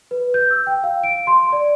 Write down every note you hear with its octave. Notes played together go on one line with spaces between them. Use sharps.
B4
G6
E6
G5
F5
D7
C6
D5